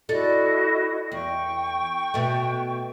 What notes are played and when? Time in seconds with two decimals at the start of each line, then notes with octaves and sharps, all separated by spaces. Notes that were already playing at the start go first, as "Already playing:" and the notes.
0.09 E4 F#4 A4 D5 D#5
1.12 E2 G5 C#6
2.14 B2 A3